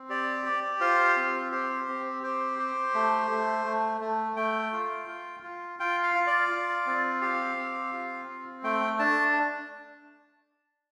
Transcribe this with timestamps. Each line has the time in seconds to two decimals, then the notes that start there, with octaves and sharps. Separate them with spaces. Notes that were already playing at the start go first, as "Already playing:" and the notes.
Already playing: C4
0.09 G4 D5
0.46 G4
0.81 F4 C5
1.17 C4
1.52 G4 C5
1.88 C4
2.23 G4 C5
2.59 G4
2.95 A3
3.31 A3
3.65 A3
4.01 A3
4.36 A3 G5
4.73 F4
5.08 F4
5.43 F4
5.79 F4 G5
6.03 F5
6.15 F4
6.27 D5
6.50 F4
6.86 C4
7.21 G4 F5
7.57 C4
7.92 F4
8.28 C4
8.63 A3 G5
8.99 D4 A5